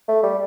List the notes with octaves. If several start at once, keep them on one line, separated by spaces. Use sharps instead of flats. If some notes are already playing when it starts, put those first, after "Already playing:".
A3
G3